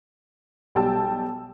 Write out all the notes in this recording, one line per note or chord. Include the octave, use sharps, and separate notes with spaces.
B1 G3 G5 A5 E6